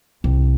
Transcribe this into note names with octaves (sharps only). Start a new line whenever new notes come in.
C2